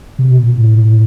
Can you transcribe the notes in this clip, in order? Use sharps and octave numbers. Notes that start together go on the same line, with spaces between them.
C3
B2
A#2
A2